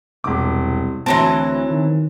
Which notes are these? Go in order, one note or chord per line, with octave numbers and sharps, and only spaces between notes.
E1 C2 D6
D2 E3 F#3 C4 A5 A#6
D#3